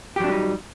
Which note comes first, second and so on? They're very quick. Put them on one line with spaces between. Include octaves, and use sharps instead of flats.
G4 F#3 D4 G3 D#4